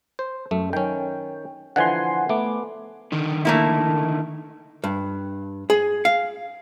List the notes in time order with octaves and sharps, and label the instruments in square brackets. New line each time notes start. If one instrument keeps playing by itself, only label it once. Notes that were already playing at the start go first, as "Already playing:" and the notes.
[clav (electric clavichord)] C5
[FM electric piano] F#2 [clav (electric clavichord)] A3
[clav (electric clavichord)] D#3 C#4 [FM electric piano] G5
[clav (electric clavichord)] D3 E3 F3 [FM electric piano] F#5 G#5 C6
[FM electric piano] A3 D6 [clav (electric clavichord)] B3
[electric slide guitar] D3 D#3
[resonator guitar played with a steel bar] A3 A#3 E4
[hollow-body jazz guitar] G2
G#4
F5